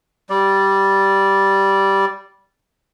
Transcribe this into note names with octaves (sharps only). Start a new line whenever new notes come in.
G3 D5